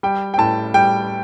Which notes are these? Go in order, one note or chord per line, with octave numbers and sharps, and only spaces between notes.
G3 G5
G5
A2 A5
G3 G5